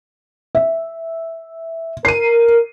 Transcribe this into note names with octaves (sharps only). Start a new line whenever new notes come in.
E5
A#4 C7 D#7